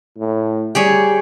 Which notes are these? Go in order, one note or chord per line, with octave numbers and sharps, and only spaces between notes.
A2
G3 G4 G#4 C#5